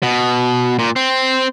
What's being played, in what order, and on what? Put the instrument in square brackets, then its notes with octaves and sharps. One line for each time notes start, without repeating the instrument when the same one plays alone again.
[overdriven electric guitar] B2
A#2
C4